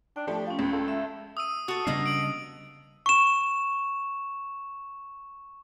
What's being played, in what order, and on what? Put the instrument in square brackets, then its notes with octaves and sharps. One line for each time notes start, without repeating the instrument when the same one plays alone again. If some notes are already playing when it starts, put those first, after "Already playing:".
[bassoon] D4 [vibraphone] G5
[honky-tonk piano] F3 A3 [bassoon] G3
[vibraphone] C#4 G5 [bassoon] F4
[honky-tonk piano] C#2
[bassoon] A4
[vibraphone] E5
[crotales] D#6 E6 D#7
[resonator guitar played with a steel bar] F#4 A4 [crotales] D#6
[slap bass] C#3 G3 D4 [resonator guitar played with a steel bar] A#3 B3 D#5
[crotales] D7 F#7
[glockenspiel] C#6 E7